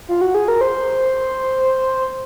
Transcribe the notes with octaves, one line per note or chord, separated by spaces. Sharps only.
F4
F#4
G#4
A#4
C5